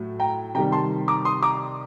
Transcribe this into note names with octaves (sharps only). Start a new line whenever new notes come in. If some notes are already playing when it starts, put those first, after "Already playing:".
Already playing: A2 F#3 A3
G5 A#5
C3 D#3 G3 G5 A#5
A5 C6
A#5 D6
C6 D#6
A#5 D6